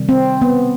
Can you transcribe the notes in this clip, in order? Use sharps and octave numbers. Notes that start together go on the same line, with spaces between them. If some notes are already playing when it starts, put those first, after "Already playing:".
Already playing: C3 D#3 G3
C4
B3